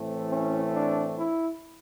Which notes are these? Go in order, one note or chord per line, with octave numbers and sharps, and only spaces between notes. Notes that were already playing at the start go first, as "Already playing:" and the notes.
Already playing: A2 E3 A3 C4
C#4
D4
E4